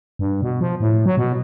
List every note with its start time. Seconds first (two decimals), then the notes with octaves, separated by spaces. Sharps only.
0.19 G2
0.42 B2
0.61 F3
0.80 A2
1.06 F#3
1.17 B2